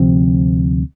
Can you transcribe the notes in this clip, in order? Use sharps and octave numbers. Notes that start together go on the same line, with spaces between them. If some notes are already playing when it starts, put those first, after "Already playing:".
Already playing: D2 C3 F3 C4